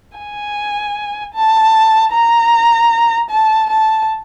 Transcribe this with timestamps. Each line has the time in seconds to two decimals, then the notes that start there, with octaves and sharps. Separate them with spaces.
0.18 G#5
1.34 A5
2.13 A#5
3.30 A5
3.70 A5